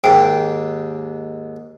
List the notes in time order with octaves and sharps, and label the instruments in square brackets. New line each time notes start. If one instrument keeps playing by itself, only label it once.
[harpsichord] D#2 G#2 [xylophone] G5